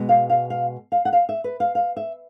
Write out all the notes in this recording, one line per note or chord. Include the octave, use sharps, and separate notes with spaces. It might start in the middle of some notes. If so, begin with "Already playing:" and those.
Already playing: B2 G#3 B3
F5
F5
F5
F5
F#5
F5
E5
B4
F5
F5
E5